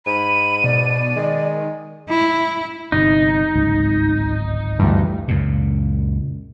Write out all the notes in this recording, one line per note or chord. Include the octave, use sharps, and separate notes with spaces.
G#2 B5 D#7
B2 D5
D#3 G#3
E4
G1 C3 D#4
D1 G#1 C#2
D2 G2 E3
C#2 F#2 A#2